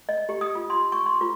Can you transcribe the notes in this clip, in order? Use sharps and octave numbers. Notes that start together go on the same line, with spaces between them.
D#5
G4
D#6
F4
C6
C#6
C6
F4